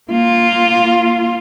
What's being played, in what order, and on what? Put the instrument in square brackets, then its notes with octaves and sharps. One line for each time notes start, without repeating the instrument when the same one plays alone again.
[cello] A#3 F4